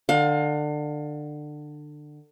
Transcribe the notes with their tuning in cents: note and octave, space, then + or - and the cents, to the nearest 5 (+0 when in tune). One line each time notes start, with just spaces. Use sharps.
D3 +25 F5 +30